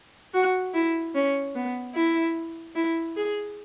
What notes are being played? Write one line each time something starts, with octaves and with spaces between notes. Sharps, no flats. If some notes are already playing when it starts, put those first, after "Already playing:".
F#4
E4
C#4
B3
E4
E4
G#4